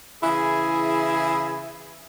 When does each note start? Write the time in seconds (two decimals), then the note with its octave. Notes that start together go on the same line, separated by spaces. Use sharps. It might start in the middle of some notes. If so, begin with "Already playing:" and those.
0.23 C#3 E3 E4 G#4